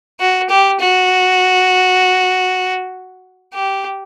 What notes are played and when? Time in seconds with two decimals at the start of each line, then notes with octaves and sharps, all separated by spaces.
0.20 F#4
0.49 G4
0.80 F#4
3.54 G4